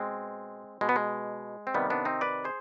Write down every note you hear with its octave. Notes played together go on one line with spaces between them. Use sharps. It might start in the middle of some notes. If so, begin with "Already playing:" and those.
Already playing: B2 G#3 C4
B2 G#3
B3
G#3
C4
C3 D#3 G3 B3
B3 D4
C4 D#4
B4 D5
G#4 C5